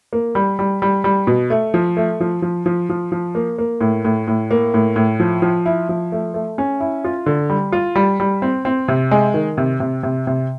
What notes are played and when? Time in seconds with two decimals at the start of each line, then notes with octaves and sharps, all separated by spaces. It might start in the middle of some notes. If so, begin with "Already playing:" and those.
0.13 A#3
0.35 G3
0.59 G3
0.82 G3
1.04 G3
1.27 B2
1.50 A3
1.74 F3
1.97 A3
2.20 F3
2.42 F3
2.66 F3
2.90 F3
3.12 F3
3.35 A#3
3.58 A#3
3.81 A2
4.05 A2
4.28 A2
4.51 A#3
4.74 A2
4.96 A2
5.20 F3
5.42 F3
5.66 E4
5.89 F3
6.12 A3
6.34 A3
6.58 C#4
6.80 E4
7.05 F4
7.26 D3
7.50 G3
7.72 F4
7.96 G3
8.20 G3
8.42 C4
8.65 C4
8.88 C3
9.11 G#3
9.34 D#3
9.58 C3
9.80 C3
10.03 C3
10.27 C3